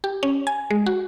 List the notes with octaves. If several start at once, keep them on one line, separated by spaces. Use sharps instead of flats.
G4
C#4
G#5
G#3
F#4